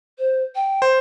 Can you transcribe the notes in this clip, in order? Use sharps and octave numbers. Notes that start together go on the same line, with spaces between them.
C5
G5
C5